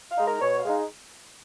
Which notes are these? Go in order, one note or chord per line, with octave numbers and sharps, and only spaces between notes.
F5
G#3 D#4
A#4
B2 C#5
F5
G#3 D#4